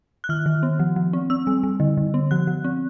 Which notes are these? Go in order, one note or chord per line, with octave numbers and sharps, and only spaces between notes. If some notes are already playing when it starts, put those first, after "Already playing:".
F#6
D#3 F6
D#3
B3
F3
F3
C4
C4 E6
G3
G3
D3
D3
B3
F3 F#6
F3
C4